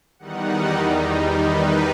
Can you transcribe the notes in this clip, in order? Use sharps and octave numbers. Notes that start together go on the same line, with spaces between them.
E2 D#3 G3 D#4 F#5
B4